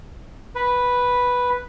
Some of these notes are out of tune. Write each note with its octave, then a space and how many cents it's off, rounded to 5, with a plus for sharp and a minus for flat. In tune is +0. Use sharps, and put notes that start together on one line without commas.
B4 -5